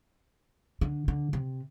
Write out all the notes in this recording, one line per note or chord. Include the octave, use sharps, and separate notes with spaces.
D3
D3
C3